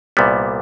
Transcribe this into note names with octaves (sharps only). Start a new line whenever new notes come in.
C2 A#2 G3 B3